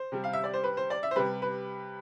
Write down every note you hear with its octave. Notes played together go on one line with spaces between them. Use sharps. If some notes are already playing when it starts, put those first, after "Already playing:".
Already playing: C5
C3 G3
F5
E5
D5
C5
B4
C5
D5
E5
C5
C3 G3 B4
B4